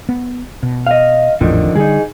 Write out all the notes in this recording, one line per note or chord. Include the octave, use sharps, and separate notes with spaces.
B3
B2
D#5 F5
G#1 E2 A2 D3 D#3 F3
D3 G3 D#4 G#4